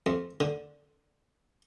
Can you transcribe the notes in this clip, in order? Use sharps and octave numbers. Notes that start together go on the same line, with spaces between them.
F2
D3